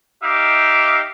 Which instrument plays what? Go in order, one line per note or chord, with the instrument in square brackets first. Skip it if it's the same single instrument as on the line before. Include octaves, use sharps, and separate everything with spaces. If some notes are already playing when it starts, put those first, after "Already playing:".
[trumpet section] D#4 G4 E5 F5 D6